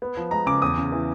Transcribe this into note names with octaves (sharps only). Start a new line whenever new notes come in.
B3
F3
G#3 A#5
C#3 D6
E2 D#6
C#3
E3